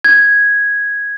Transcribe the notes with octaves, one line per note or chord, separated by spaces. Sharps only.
G#6